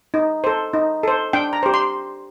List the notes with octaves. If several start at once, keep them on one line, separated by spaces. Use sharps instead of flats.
D#4
A4 C5
D#4
A4 C5
D4 G5
A#5
G4 C5
C6